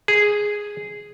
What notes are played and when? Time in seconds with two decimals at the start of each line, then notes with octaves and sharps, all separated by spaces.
0.08 G#4